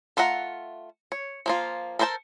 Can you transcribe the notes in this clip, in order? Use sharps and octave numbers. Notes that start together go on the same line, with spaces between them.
A3 F4 E5 F#5 A#5
C#5
F3 A#3 F4
A4 A#4 C5 C#5 A5